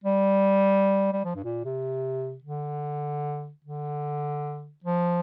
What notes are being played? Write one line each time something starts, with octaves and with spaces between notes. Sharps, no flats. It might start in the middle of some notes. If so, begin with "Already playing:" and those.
G3
G3
F3
G2
A#2
C3
D3
D3
F3